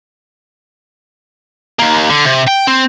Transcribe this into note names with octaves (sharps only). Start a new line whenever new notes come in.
D#2 A#3
D3
C3
G5
C4